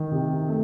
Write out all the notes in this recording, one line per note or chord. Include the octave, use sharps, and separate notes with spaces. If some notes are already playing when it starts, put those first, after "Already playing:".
Already playing: D#3
C3
A3